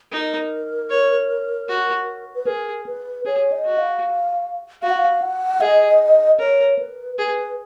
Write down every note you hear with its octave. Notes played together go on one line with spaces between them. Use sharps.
D#4 A#4
C#5
F#4
B4
G#4 A#4
B4
G#4 C#5
D#5
F#4
F5
F#4 F5
F#5
F5
F#5
G#4 D#5
A#4 C#5
B4
G#4 B4